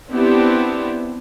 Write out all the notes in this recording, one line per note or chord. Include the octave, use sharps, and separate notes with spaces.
B3 C4 D4 E4 G4